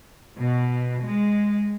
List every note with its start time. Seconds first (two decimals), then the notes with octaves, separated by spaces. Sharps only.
0.36 B2
0.99 G#3